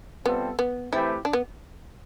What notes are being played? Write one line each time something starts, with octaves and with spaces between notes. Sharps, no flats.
C3 G3 B3 C4 F4 A4
B3
E3 A3 C4 E4 G4 B4
D4
B3